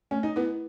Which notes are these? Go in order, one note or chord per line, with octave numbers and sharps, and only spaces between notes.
A3 C#4
D#4
B3 E4 B4